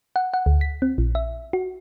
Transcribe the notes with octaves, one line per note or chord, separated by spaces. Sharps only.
F#5
F#5
D2
B6
C4
A#1
E5
F#4